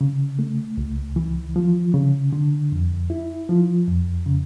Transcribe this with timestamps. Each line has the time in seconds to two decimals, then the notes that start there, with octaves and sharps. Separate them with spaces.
0.01 C#3
0.39 A3
0.78 C#2
1.16 E3
1.56 F3
1.94 C#3
2.33 D3
2.72 F2
3.10 E4
3.49 F3
3.87 F2
4.26 C#3